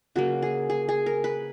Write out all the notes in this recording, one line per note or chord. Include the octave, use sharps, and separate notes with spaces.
C#3 F#3 A#3 F#4
G#4
G#4
G#4
A#4
B4